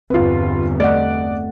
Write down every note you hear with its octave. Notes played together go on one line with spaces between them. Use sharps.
G1 E2 C4 F4 B4
A3 D5 D#5 F#5